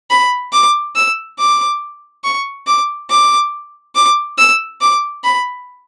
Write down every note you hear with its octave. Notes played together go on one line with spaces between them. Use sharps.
B5
D6
E6
D6
C#6
D6
D6
D6
E6
D6
B5